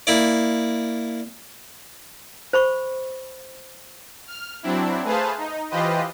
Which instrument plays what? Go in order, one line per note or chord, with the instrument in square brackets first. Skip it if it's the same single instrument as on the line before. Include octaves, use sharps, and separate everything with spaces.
[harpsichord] A#3 E4 D5
[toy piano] C5 B5 C#6
[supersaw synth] F6
F#3 C4 D4 E4
A3 G#4 B4 C5 F5 A5
D#4
E3 F4 G4 B4 C5 D#5